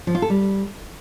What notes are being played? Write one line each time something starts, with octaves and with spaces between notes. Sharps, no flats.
F3
F4
A4
G3